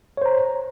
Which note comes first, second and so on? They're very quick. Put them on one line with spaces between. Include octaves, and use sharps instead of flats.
C#5 C5 A#5